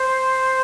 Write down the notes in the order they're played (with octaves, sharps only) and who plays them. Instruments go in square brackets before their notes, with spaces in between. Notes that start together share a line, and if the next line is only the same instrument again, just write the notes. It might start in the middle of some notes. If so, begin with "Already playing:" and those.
Already playing: [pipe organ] C5